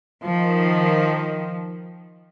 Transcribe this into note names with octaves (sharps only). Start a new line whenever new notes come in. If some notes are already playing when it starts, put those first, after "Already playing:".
D#3 F3